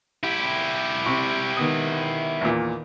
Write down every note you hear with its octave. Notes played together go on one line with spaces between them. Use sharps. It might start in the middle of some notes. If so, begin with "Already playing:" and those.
E4 G4
C3 C#6
D#3 B3 D#6
E2 A#2